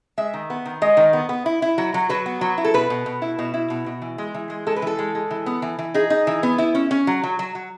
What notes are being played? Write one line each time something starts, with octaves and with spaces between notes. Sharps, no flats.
G#3 E5
D#3
B3
D#3
G#3 D#5
D#3
B3
B3
E4
E4
F#3
F#3
F#3 B4
B3
F#3
E4
A4
B2 B4
B2
B2
E4
B2
E4
B2
B2
E3
G#3
E3
G#3
G#3 A4
B4
E3 A4
G#3
G#3
E3
B3
E3
E3
D#4 G#4
D#4
E3
B3
E4
C#4
C#4
F#3
F#3
F#3
F#3